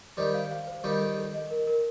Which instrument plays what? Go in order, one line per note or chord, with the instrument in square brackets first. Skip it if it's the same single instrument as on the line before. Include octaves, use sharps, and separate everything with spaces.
[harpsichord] D#3 G3 [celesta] C5
[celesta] F5
F5
C5
[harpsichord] D#3 G3 [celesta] D#5
[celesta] A4
A4
D#5
A#4
A#4